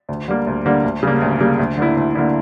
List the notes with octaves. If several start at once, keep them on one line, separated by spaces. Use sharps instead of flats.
D2
D3 G3 A#3
D2
D3 G3 A#3
D2
C#3 G3 A#3
D2
C#3 G3 A#3
D2
D3 A#3 E4
D2
D3 A#3 E4